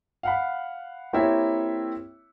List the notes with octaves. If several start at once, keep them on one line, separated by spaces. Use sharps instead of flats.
F5 F#5 B5
A#3 C4 E4 G4 C#5 E5